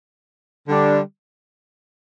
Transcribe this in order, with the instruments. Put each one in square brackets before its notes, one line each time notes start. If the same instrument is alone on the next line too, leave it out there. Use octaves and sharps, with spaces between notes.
[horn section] D3 G3 D4